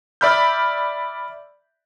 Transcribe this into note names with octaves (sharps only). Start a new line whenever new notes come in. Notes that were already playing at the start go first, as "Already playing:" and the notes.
D5 E5 B5 F6 G6